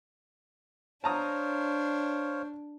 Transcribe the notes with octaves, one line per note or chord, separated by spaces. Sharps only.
D4 C5 C#5 F5 A5 A#5 D#6